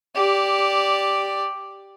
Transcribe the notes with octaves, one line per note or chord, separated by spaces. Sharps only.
G4 D5